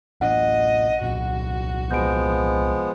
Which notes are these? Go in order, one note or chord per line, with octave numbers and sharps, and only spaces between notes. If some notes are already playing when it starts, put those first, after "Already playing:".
A1 D4 D#5 F#5
C2 A#2 F#4
F3 G#3 B3 G6 D7